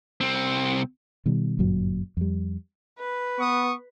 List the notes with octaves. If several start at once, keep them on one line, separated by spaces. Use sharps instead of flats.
C2 C4
B2 D#3 G3
G1 F#2 A#2 F#3
F2 G3
B4
B3 C#6 D#6